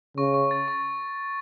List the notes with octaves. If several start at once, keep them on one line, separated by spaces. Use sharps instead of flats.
C#3 C#6
C#6
A6
C#6